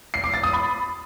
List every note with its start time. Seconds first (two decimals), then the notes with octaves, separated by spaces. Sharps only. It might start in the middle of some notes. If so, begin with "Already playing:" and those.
0.14 C7
0.24 D6
0.34 A6
0.43 D#6
0.53 B5